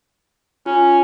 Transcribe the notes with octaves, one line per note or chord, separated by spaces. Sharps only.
C#4 F4